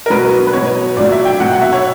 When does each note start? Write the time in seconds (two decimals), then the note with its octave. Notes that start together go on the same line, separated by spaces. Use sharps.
0.06 A#4
0.10 B2 F#3 B4
0.47 B4
0.53 B2 F#3 C#5
0.97 A#2 F#3 D5
1.12 E5
1.25 G5
1.40 B2 F#3 F#5
1.53 F#5
1.62 E5
1.73 C#5